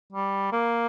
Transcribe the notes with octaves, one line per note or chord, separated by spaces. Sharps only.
G3
A#3